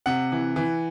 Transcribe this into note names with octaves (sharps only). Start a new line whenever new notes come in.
C3 F#5
E3
E3